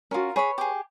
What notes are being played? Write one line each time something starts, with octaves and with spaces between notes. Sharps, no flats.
C#4 F4 F#4 A#4
G#4 B4 C#5 B5
G4 G#4